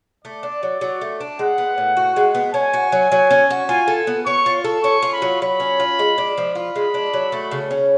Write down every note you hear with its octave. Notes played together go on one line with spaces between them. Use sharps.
A3 D5
D4
F#3
F#3
A3
D4
G#3 F#5
B3
A2
F#4
G#3
B3
C#4 G#5
F#4
F#3
F#3
C#4
F#4
F4 G#5
A4
B3
C#5 C#6
F4
A4
C#4 C#6
F4
B5
F#3
F#3 B5
C#4
F4
G#3
D4
F3
F4 B5
G#3
D4
F#3
A3
C#3
C#4